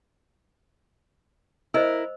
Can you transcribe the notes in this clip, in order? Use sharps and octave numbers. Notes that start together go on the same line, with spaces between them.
E4 A#4 C5 D#5 E6